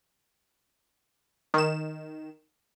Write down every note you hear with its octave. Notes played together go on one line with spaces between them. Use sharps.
D#3 E7